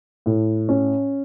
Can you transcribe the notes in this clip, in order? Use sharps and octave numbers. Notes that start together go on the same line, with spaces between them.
A2
C#4